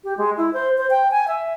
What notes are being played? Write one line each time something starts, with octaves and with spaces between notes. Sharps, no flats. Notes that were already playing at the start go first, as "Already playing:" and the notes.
G4
G#3
E4
C5
C5
G5
G#5
E5